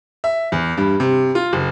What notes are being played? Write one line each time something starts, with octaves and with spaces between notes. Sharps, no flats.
E5
E2
G2
C3
F4
F#1